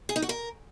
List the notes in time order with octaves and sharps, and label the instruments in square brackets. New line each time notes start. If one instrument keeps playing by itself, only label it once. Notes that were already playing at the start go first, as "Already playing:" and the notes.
[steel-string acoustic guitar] G#4
D#4
F#4
A#4